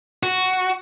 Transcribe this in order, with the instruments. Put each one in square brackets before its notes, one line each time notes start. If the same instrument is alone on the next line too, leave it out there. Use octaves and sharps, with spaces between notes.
[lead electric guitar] F#4